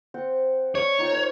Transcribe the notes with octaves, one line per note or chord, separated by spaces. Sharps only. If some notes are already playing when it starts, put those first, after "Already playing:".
C4 F#5 G5
C#5 D5 F5 C#6
D#4 F4 G5
A#4 C5